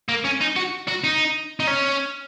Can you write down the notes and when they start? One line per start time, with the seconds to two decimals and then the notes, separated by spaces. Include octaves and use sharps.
0.09 A#3
0.25 C#4
0.41 D#4
0.56 F#4
0.88 F#4
1.04 D#4
1.60 D#4
1.67 C#4